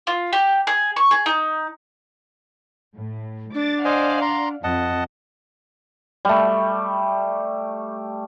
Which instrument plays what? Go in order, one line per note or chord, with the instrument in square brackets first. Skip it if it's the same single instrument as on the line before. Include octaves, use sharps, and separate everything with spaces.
[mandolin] F4
G4
G#4
C#6
G#4
D#4
[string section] A2
[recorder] D4 [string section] D6 A6
[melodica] C5 D#5 G#5 [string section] D5 F5 F#5
[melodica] A#5 C6
[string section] F2 [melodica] D#5 F#5 A5
[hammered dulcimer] G3 A3